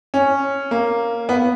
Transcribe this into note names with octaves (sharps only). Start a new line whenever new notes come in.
C#4
A#3
B3